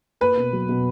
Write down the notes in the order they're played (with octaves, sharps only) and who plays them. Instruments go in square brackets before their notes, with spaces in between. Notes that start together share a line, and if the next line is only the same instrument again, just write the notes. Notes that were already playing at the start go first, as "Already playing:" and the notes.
[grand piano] A#3 [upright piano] B4
[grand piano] B2
F#3
B2